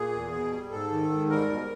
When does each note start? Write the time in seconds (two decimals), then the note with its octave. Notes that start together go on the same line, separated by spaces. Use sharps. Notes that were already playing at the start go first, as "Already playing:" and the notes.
Already playing: A#2 G#4
0.13 E2
0.32 B2
0.52 G3
0.71 G#2 A4
0.91 D#3
1.10 G#2
1.30 G3 A#4
1.49 B2